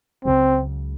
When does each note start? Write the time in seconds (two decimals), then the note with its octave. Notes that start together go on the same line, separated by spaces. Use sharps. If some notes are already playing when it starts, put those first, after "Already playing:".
0.24 C#2 C#3 F#3 C4